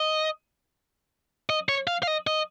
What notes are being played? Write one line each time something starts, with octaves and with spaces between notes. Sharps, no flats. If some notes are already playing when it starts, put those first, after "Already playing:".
Already playing: D#5
D#5
C#5
F5
F5
D#5
D#5